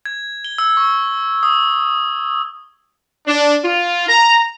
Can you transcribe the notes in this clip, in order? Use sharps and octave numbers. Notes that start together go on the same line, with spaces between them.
G#6
G7
E6
C#6
D#6
D4
F4
A#5